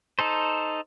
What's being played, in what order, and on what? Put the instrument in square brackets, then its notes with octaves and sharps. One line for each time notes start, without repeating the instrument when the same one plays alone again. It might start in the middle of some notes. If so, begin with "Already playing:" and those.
[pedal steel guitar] D#4 A4 C5